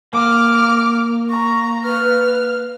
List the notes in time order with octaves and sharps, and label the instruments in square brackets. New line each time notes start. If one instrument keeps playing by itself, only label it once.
[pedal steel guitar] A#3 [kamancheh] D6 F6
[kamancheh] A#5 [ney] C#6
[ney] B4 [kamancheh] F6